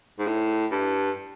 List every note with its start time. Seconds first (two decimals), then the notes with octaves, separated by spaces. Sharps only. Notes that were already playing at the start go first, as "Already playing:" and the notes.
0.19 G#2
0.27 A2
0.71 G2